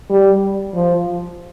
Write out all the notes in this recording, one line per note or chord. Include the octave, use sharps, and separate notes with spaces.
G3
F3